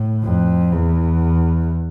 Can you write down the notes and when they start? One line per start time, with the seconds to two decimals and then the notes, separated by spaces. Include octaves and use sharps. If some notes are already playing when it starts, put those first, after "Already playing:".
Already playing: A2
0.24 F2
0.72 E2